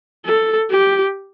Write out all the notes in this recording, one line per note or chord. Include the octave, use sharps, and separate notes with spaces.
A4
G4